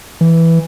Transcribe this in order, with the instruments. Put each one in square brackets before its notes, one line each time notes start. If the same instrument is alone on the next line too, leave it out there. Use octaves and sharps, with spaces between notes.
[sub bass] E3